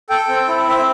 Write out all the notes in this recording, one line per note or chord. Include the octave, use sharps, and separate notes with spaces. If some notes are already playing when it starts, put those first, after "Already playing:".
A4 G5
C4
E4
C4 E5